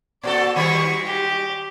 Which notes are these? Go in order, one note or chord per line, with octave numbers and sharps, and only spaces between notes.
A#2 F#4 A4 D5
D#3 G3 G#3 C#6
G4